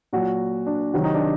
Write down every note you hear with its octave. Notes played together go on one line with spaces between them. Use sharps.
A#2 F#3 F#4
D4
C3 D#3 F#3 F#4
D#4
D4